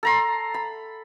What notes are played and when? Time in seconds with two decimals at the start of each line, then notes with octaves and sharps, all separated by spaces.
0.03 A4 A#5 C6
0.54 B5